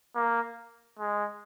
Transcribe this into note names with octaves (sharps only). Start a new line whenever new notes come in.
A#3
G#3